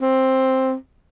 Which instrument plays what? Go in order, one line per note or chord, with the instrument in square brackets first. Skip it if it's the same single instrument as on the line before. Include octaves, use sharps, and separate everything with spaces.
[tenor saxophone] C4